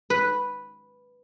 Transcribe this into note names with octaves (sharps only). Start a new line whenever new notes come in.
B4